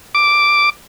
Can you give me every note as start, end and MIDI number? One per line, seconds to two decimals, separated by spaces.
0.15 0.70 86